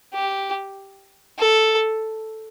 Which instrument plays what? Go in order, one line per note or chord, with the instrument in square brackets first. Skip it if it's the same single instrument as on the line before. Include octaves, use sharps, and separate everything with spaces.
[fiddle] G4
A4